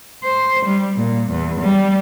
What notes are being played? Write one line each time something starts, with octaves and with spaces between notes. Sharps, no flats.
C5
G3
A#2
E2
G3